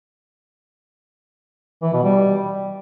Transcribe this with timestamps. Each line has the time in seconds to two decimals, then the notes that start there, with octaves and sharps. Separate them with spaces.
1.83 E3
1.93 B2
2.04 G3